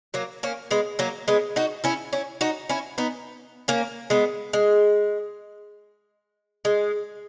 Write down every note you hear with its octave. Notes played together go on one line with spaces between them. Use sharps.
F#3 A#3
A#3 C#4
G#3 B3
F#3 A#3
G#3 B3
D#4 F#4
C#4 E4
C#4 E4
D#4 F#4
C#4 E4
B3 D#4
A#3 C#4
G#3 B3
G#3
G#3